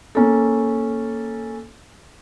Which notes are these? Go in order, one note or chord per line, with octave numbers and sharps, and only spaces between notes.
A#3 C#4 A4